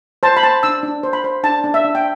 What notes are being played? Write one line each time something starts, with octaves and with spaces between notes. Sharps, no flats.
C5 A5
B5
C5 A5
D4 E6
D4
C5
B5
C5
D4 A5
D4
E5
D4
G5